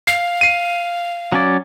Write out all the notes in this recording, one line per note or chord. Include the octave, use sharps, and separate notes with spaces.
F5 C7
C7 D#7
F#3 C#4 D5